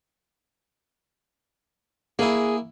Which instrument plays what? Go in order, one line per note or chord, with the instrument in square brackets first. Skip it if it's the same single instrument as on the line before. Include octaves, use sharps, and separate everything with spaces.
[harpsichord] A#3 E4 [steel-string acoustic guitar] G#4 G#5